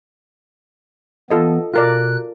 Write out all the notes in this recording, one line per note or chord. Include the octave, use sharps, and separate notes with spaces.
E3 B3 F4 A4 D#5
B2 F4 A#4 D5 F#6